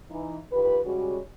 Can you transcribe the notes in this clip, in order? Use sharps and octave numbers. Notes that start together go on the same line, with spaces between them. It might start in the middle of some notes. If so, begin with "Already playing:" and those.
E3 D#4
D#3 F4 G4 B4
C#3 G3 G#3 C#4 F#4